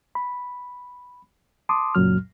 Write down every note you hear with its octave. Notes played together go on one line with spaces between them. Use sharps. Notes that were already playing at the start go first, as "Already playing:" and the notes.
B5
A5 C6 D6 D#6
C#2 F#2 A#2 F#3 F6